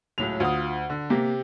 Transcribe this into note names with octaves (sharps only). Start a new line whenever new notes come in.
C#2 A2 F#3 F7
D2 F4 D#6
D3
C3 A#3 G4